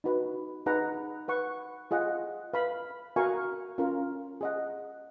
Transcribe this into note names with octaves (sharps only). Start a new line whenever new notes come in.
D#4 F#4 B4
D#4 G#4 B4 F#5 A#5
B4 F#5 C#6
F4 G#4 D#5 F#5
B4 F5 B5
F#4 A#4 F5 G#5 C#6
C#4 F4 A#4
G#4 D#5 F#5